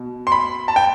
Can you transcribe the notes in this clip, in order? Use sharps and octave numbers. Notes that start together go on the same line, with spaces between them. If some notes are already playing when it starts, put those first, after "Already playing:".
Already playing: B2
C6
B5
A5
G5